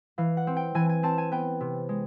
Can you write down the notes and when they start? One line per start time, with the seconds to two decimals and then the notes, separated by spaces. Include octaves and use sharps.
0.18 E3 F5
0.37 F#5
0.47 C4
0.56 G5
0.75 E3 G#5
0.89 G#5
1.03 C4 A5
1.18 G#5
1.32 B3 G5
1.60 C3
1.89 G#3